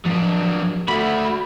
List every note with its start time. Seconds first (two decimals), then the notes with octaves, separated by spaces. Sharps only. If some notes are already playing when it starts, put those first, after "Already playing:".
0.06 F3 F#3 D4
0.88 A3 F#4 B5